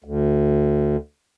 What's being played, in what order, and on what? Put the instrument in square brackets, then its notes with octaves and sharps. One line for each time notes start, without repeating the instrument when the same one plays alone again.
[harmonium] D2